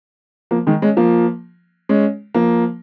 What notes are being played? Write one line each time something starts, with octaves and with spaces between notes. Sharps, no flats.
F3 A#3
D#3 G#3
G#3 C#4
F3 A#3
G#3 C#4
F3 A#3